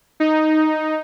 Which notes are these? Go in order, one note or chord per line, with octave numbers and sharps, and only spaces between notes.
D#4